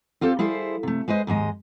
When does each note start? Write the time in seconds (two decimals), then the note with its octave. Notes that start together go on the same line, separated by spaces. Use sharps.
0.21 C4 F4 G4 A4 C5
0.39 G3 E4 G#4 A4 C5
0.83 C3 A3
1.08 G#3 B4 C5 D#5
1.27 D#2 G#2 G#3 D#5